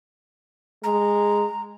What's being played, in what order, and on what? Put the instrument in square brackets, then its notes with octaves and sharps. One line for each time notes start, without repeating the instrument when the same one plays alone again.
[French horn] G#3 [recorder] A#5